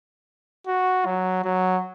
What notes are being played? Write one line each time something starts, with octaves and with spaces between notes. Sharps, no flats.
F#4
F#3
F#3